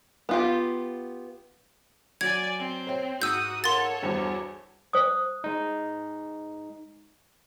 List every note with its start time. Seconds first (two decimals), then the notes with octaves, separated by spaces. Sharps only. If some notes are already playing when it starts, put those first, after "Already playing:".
0.29 B3 F4 G4
2.21 F#3 D5 G#5 G#6
2.59 C4
2.87 C5 C#5 G5
3.22 G#2 F#4 D#6 E6 G6
3.64 A4 A#4 C#5 F5 F#5 C6 A6
4.03 E2 G2 F#4 C5 B5
4.93 C5 D#6
5.44 G#3 D#4